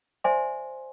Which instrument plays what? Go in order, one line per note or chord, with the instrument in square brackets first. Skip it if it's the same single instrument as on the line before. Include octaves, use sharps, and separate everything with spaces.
[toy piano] C5 D5 E5 G#5 C6